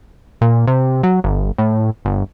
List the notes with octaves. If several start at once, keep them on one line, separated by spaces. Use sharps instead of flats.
A#2
C3
F#3
G1
A2
G1